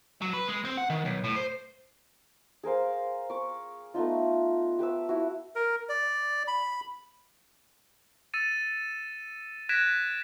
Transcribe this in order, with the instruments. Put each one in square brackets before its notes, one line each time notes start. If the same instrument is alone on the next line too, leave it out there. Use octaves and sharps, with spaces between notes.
[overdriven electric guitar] F#3
B4
G#3
C4
F#5
D#3
B1
A2
C5
[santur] G#4 A#4 C5 F5
C#6 D6
A3 B3 D#4 F4
G4 B4 E5 E6
E4 F#4
[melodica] A#4
D5
B5
[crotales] E6 A6 C#7 D#7 E7
F#6 G#6 A#6 B6 D7 E7